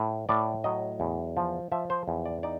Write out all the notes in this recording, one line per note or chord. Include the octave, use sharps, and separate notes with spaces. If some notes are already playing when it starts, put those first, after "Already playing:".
Already playing: A2
A2 D5
F#3 D#5
E2
F3
F3 E5
C5
E2
D5
D#4 D5